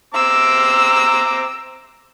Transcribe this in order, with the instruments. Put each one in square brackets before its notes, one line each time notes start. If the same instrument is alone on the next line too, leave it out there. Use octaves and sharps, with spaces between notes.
[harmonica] C4 A#5 D6 [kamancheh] E6